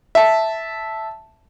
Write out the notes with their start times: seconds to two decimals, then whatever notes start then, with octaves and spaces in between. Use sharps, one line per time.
0.15 E5 A5